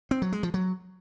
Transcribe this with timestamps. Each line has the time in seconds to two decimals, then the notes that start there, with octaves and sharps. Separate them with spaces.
0.11 C4
0.22 F#3
0.32 G#3
0.43 F3
0.54 F#3